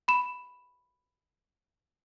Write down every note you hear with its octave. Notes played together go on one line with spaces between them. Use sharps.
B5 E7